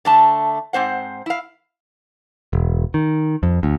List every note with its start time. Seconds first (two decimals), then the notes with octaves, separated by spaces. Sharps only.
0.05 D3 A3 A5
0.73 G#2 C4 C5 F#5
1.26 E4 F5
2.53 E1
2.94 D#3
3.43 F2
3.63 D2